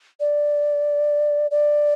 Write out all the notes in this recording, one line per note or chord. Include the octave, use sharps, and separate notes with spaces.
D5
D5